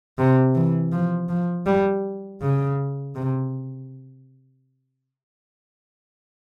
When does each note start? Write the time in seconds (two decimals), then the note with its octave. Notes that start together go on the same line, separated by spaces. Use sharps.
0.18 C3
0.55 E3
0.92 F3
1.29 F3
1.66 G3
2.41 C#3
3.15 C3